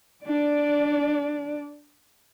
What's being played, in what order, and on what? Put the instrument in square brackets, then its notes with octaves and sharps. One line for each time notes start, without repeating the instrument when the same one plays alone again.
[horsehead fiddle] D4 D5